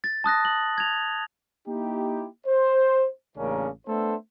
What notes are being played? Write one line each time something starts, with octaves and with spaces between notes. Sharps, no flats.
A6
A5 D#6 F#6 A#6
F#7
G#6 F7
A#3 D#4 E4 G4
C5
A1 C#3 A#3 C#4 D4 A#4
A3 B3 D4 A4 C5 E5